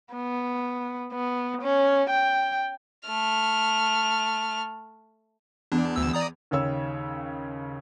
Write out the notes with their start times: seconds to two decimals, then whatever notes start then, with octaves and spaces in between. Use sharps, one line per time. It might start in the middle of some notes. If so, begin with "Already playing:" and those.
0.14 B3
1.13 B3
1.62 C#4
2.09 G5
3.07 A3 F6
5.72 E2 D4
5.96 D2 E6
6.13 D5 A#5 D#6
6.51 D#2 C#3 C#5 E6